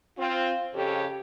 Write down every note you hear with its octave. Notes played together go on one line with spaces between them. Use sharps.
C4 F4
F2 C#3 G4 A4 C#5